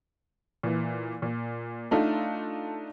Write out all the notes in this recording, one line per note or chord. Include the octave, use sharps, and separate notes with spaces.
A#2 E3
A#2
A3 D4 D#4 F4 A4